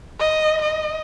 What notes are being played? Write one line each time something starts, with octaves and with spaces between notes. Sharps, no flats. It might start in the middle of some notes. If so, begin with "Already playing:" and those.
D#5
D#5